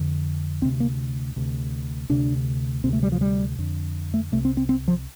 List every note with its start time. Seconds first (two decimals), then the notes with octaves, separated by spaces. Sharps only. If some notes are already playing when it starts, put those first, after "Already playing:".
Already playing: F2 D3
0.62 D2 C4
0.65 C3
0.80 A#3
1.36 D2 C3
2.09 D2 C3 D4
2.84 D2 C3 C4
2.93 A3
3.03 G3
3.12 F3
3.21 G3
3.58 F2 D3
4.14 A3
4.32 C2 C3 A3
4.45 C4
4.57 C4
4.69 C4
4.88 F3